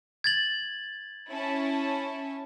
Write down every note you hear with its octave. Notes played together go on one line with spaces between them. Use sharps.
G#6 A6 F#7
C#4 E4 A5